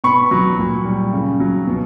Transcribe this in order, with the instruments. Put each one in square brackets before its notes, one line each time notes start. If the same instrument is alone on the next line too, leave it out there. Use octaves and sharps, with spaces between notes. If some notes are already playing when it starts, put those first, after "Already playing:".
[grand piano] B2 B5 C#6
F#3
A#2
G3
C#3
F#3
B2